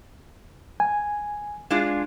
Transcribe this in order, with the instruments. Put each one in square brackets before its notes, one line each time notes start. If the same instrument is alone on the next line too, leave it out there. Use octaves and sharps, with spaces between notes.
[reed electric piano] G#5
[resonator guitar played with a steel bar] G#3 D4 F4